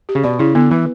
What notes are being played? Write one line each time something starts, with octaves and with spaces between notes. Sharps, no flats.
G4
C#3
B2 D5
C#3 E4
D3 B3
E3 B4